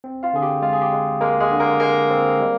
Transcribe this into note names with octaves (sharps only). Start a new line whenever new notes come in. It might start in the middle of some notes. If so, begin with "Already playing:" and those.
C4
F4 F5
D3 G#4
G4
G#3 F4
G#4
G4
G#3
G#3 A#3 A#4
G#3 G#4
D3
A#3 A#4
G#3 A#3 A#4
C4
G3